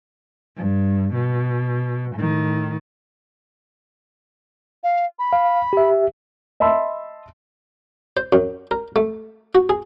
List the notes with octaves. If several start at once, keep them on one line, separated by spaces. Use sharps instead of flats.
G2
B2
A2 D#3
F5
B5
F5
G4 E5
D#5 E5 A5 B5 C6 E6
C5
F#2
A#4
A3
F#4
G#4